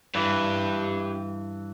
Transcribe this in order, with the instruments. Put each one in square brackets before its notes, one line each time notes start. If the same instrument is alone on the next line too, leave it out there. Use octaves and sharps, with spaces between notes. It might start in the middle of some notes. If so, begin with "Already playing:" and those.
[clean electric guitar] G2 E3 [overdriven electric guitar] G4 B4